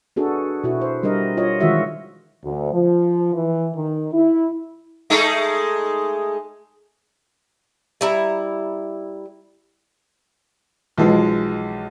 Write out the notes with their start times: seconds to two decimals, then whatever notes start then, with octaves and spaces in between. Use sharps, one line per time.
0.16 B3 D4 F#4 G#4 A4
0.64 B2 E4 F#4
0.81 C5
1.03 G3 D4 A#4 D#5
1.37 F4 C#5 D#5
1.60 D#3 E3 G#3 F4 F#4 E5
2.45 D2
2.73 F3
3.34 E3
3.75 D#3
4.13 E4
5.10 G#3 A3 D#4
8.01 G3 E4 A#5
10.98 B1 E3 F3 G#3